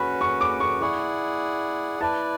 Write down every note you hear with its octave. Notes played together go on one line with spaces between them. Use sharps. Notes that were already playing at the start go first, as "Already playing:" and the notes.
Already playing: C#4 F#4 B4 B5
C#6
D6
C#6
E4 G#4 D5 F#5 C#6
E4 B4 D5 A5